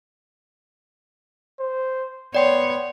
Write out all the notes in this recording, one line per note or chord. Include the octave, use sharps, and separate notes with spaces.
C5
B3 C#5 D5 G5 C6